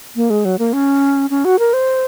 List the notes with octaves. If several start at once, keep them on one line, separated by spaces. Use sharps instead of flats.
A#3
G#3
F#3
A#3
C#4
C#4
F#4
A#4
C5